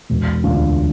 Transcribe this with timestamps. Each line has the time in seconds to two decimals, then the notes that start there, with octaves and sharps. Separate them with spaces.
0.10 E1
0.44 D2 D3 F4